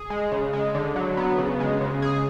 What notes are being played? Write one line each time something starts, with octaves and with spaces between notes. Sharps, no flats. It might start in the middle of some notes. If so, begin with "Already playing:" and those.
Already playing: G#4
G#3
C#3
G#3
D3
F#3
B3
C#3
G#3
C#3
G#4